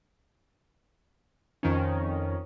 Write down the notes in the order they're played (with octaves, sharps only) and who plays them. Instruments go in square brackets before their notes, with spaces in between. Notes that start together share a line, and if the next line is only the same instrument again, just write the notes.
[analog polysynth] F2 D#3 F3 C#4